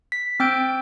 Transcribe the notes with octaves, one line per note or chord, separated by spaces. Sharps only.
B6
C4 G5 E6 G6 D7